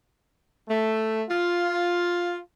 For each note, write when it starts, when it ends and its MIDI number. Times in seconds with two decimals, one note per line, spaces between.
0.69 1.22 57
1.30 2.38 65